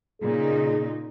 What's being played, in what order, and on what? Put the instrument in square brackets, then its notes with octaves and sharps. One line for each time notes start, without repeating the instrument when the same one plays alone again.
[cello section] A#2 C#3 D#4 [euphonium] G#4